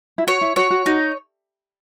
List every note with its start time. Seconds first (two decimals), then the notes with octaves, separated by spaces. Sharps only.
0.18 E4
0.27 F#4 C#5
0.41 E4
0.56 F#4 C#5
0.71 F#4
0.86 D#4 F#4